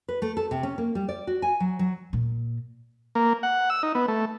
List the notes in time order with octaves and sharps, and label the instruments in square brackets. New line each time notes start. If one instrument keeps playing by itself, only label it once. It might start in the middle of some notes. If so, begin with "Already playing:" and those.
[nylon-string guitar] B4
A3
A4
C3
C#4
A#3
G3
D5
F#4
G#5
F#3
F#3
[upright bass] A#2
[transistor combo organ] A#3
F#5
E6
D#4
B3
A3